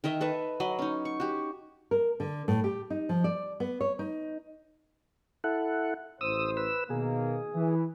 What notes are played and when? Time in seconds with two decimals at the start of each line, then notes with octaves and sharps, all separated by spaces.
0.04 D#3 A#4 D#5 E5
0.21 A4 B4 D#5 E5
0.60 F#3 D#5 B5
0.79 C#4 D#4
1.05 C#6
1.20 F#4 G4
1.91 A#4
2.20 D3
2.48 A2
2.64 G4
2.90 D#4
3.09 F3
3.24 D5
3.60 B3
3.81 C#5
3.99 D#4
5.44 E4 A4 F#5
6.21 A1 C5 D#6 E6
6.57 B4 E6
6.90 B2 D#3 A#3 G#4
7.55 E3